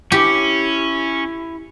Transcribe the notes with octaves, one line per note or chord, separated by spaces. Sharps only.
C#4 E4 G4